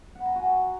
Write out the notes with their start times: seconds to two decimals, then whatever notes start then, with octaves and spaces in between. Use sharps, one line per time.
0.15 F#5
0.20 B5
0.26 A#5
0.31 G#5
0.36 F#4